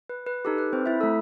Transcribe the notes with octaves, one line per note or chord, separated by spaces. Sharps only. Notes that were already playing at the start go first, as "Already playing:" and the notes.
B4
B4
D#4 G4 A4
B4
C4 C5
E4 E5
A3 E4 A4